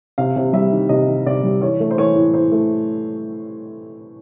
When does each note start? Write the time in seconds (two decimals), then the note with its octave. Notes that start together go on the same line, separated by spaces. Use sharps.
0.18 C3 F5
0.36 C3
0.53 G3 E5
0.72 D#3
0.89 C3 D#5
1.08 D#3
1.26 C3 D5
1.44 G3
1.61 E3 C#5
1.80 A3
1.91 C5
1.98 E3 C#5
2.16 A2
2.34 A2 C5
2.52 A3